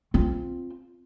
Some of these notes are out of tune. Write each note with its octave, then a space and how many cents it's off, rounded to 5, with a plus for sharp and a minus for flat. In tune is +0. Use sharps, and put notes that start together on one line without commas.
C4 +5 F4 +0